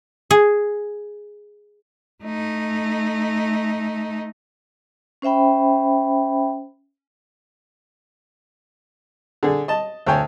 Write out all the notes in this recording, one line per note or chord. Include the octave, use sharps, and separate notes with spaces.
G#4
A3 D#4
C#4 C5 E5 G5 B5
D3 G#4
D#5 A5
D2 C#5 G5 G#5